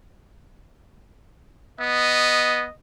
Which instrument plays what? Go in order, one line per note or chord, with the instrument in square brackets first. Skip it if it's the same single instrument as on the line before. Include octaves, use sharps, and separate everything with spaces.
[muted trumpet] B3 [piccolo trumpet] D#5